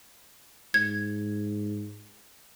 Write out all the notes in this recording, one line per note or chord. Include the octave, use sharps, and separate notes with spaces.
G#2 G#6